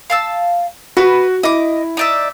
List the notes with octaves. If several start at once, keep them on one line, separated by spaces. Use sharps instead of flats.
F5 A5 E6
F#4 B4
E4 D#5 D6
D#4 D5 E5